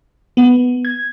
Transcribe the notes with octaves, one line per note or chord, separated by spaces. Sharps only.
B3
G#6